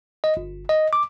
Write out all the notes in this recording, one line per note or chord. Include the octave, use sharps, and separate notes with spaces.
D#5
G1
D#5
D6